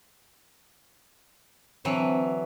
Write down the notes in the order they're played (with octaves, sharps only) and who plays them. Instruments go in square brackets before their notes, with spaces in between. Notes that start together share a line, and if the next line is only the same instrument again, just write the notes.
[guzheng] D3 E3 F#3 [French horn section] C4